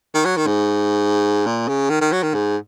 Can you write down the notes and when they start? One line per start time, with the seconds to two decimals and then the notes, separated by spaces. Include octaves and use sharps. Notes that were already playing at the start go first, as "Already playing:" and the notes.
0.14 D#3
0.25 F#3
0.37 D#3
0.47 G#2
1.46 A#2
1.68 C#3
1.90 D#3
2.01 D#3
2.12 F#3
2.23 D#3
2.34 G#2